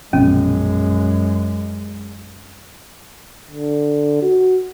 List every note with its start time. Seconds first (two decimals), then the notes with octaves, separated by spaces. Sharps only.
0.13 A#1 F#2 B2 F3 G#3 C#4
3.50 D3
4.22 F#4